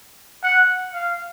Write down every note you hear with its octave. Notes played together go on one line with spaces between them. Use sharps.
F#5
F5